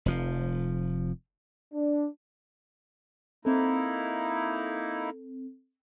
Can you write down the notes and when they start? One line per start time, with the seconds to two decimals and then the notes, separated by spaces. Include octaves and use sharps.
0.06 F1 F3
1.73 D4
3.45 A#3 C4 D#4 E4 A4